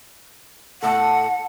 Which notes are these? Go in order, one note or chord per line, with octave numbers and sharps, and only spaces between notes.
A2 A3 A4 F#5